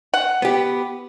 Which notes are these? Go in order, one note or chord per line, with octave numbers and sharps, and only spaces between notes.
F#5
B3 G4